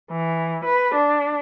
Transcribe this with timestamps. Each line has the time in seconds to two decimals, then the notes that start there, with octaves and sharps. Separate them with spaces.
0.11 E3
0.64 B4
0.95 D4